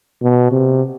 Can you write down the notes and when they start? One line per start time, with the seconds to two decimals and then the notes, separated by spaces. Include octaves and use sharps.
0.22 B2
0.51 C3